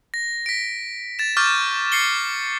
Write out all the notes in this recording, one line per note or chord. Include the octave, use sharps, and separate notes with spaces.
A#6
B6 D7
A6 E7
C#6 D6 F6 G6 A6
A6 C7 C#7 G7